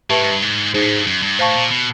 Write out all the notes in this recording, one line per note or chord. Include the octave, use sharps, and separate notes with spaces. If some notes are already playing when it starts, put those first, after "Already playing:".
A2 G4 B4 E5 A5 C#6
G#2
G2
G#2
G#2 D#4 G#4 C5
A2
G#2
G2
F#2
G2
A2 C5 F5 A5 C#6
A#2
B2